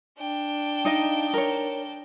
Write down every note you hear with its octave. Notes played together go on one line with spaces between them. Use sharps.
D4 G5
D#4 D#5 F5
A#4 C#5